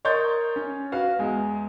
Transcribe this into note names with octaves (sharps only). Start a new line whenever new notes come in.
A#4 C#5 D#5 C6 G6 A6
C#4
F#4 B4 F5
E2 G#3